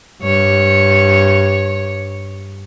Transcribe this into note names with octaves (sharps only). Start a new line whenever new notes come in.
G2 C#5